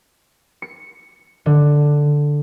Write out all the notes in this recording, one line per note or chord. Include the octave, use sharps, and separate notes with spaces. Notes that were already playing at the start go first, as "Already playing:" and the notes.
C#7
D3